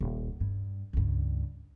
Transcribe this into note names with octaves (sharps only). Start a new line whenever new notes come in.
D#1
G2
C#2 G2